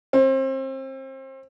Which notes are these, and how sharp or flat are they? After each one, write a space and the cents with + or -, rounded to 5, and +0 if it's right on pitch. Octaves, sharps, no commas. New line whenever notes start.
C4 +30